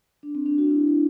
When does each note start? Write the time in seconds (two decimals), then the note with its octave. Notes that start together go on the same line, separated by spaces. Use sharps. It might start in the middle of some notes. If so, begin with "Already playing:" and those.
0.23 D4
0.35 C4
0.46 D4
0.58 F#4
0.71 E4
0.87 E4